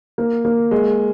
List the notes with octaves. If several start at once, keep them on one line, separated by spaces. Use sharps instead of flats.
A#3
A#3
G#3